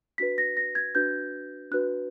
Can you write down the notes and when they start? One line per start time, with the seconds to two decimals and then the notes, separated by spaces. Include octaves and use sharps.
0.18 D4 F#4 B4 B6
0.38 A#6
0.57 A#6
0.75 G#6
0.95 D4 F#4 B4 G6
1.71 D4 F#4 B4 F#6